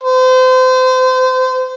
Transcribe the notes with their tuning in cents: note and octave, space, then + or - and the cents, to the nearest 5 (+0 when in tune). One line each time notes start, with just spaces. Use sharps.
C5 -30